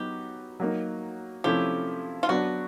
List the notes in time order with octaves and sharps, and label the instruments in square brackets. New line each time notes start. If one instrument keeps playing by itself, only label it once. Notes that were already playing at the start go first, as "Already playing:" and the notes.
Already playing: [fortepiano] F#3 B3 D#4 [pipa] G4
[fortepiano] F#3 A#3 D#4
[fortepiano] C3 F3 A3 C#4 E4 [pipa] G4
[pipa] F4
[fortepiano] F#3 B3 D4 [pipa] F#4